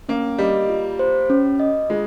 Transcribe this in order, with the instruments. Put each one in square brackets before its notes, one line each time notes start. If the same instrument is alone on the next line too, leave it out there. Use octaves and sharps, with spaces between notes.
[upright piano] A#3 [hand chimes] C#4
[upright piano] G3 [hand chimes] D#5
[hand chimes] F4
C5
C#4
D#5
[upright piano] G#3 [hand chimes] F4